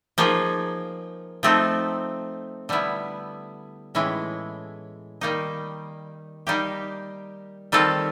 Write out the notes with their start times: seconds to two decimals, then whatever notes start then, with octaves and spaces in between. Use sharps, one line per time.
0.18 F3 A#3 D#4 G#4
1.43 F3 A3 C4 D#4
2.69 D3 G3 B3 E4
3.95 A2 E3 G#3 C#4 E4
5.21 D#3 G3 A#3 D#4
6.47 G3 A#3 D#4 G4
7.72 D#3 G3 C4 F4 A4